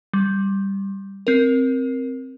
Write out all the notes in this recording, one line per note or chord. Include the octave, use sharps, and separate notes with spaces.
G3
C4 A#4